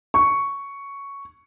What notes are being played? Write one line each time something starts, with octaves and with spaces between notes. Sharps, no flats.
C#6